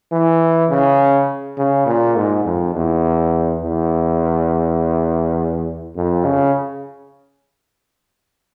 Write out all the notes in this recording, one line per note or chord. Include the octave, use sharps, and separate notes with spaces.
E3
C#3
C#3
A#2
G#2
F2
E2
E2
F2
C#3